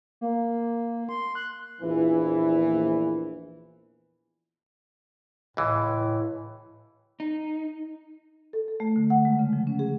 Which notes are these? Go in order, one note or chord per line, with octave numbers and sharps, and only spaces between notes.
A#3
C6
F#6
A#1 E2 E3
C#2 A2 E3
D#4
A4
A4
A3
D3
F#5
G#3
C#3
F3
C#4
G#4